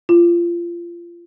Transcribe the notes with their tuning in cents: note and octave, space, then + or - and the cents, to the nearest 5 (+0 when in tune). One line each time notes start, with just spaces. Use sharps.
F4 -25